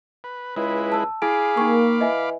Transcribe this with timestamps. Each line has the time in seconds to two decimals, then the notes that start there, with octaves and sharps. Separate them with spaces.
0.24 B4
0.56 C#2 G#3 E4 B4
0.92 A5 E6
1.22 E4 G#4 F5 B5 D6 D7
1.57 A#3 D#4 G5 C#6
2.01 E3 D#5 E5 G#5